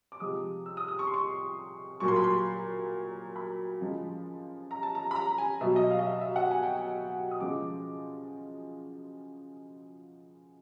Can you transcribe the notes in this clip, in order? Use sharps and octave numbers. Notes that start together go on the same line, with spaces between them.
D6
C3 F3 G#3 D#6
E6
D#6
D#6
C#6
C6
C#6
A#2 F#3 C#6
C6
B5
C6
B5
C#3 F3 G#3
A#5
A5
A#5
B5
A#5
G#5
B2 F#3 E5
D#5
F5
D#5
E5
E5
F#5
G#5
G5
G#5
D#6
C#3 F3 G#3 D6